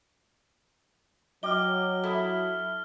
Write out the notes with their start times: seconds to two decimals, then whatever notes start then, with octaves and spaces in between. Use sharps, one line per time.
1.43 F#3 D#5 G5 D6 F6 G7
2.04 E4 A4 D#6